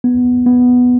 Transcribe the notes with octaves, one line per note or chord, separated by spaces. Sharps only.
B3
B3